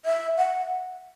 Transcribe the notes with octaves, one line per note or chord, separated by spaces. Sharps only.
E5
F#5